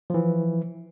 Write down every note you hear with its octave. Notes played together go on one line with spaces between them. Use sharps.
E3 F3